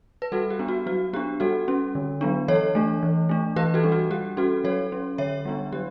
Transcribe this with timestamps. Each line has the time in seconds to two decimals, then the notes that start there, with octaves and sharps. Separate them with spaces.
0.22 B4
0.32 G3 F#4 A4
0.50 G4
0.59 B3 D4
0.68 F#4
0.86 F#3 F#4
1.13 B3 D4 G4
1.40 G3 F#4 A4
1.68 C#4
1.95 D3
2.21 F#3 B3 D4
2.48 E3 A4 C#5
2.75 A3 D4
3.03 E3
3.29 A3 D4
3.56 E3 G4 B4
3.74 F#4 A4
3.84 G3 D4
3.92 F#4
4.10 G3 G4
4.37 C#4 F#4 A4
4.64 F#3 A4 C#5
4.92 C#4
5.18 D3 C#5 E5
5.45 G3 B3 D4
5.73 F#3 G4